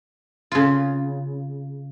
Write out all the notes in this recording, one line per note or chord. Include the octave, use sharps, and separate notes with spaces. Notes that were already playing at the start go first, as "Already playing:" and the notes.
C#3 F4